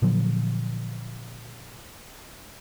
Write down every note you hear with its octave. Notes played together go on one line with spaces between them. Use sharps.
A#2 D3 F3 F#3